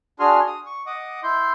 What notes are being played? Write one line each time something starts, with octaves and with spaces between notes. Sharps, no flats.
D4 F#4 G#4 G#5 C6 F6
D#6
C#6
D#5 F#5 D6 D#6
E4 C6 G6